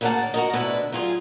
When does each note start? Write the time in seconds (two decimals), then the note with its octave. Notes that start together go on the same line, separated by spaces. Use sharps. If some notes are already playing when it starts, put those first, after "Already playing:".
0.01 D2 C#3 A#3 E5 F#5 A5
0.34 F#4 A#4 D#5
0.53 D2 B2 D4 E4 B4
0.92 F#2 F4 G#4